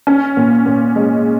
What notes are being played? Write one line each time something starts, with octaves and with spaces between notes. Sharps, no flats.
C#4
A#2
A#2
G#3